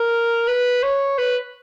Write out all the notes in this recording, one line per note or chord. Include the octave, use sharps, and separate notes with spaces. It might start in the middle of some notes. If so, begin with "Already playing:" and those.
Already playing: A#4
B4
C#5
B4